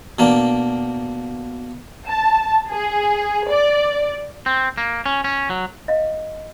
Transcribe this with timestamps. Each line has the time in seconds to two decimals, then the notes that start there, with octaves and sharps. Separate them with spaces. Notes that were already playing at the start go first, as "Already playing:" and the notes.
0.19 B2 A#3 D4
2.08 A5
2.70 G#4
3.50 D5
4.46 C4
4.78 A#3
5.06 C#4
5.24 C#4
5.50 F#3
5.88 D#5 F5